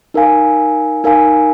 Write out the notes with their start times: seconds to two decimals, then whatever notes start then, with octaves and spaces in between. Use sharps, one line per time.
0.14 D#4 A#4 F5 G#5
1.04 D#4 A#4 F5 G#5